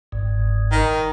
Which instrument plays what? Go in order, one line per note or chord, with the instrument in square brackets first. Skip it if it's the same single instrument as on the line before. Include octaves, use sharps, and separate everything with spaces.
[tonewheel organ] G1 G#2
[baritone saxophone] D#3